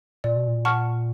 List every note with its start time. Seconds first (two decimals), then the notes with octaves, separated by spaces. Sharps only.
0.24 A#2 D5
0.36 B2
0.48 A#2
0.65 F#5 A5 C#6 F6